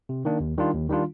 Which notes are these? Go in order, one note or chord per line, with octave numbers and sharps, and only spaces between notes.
C3
D#3 A#3 D4
D#2
D#3 G3 D4 F4
D#2
D#3 G3 D4 F4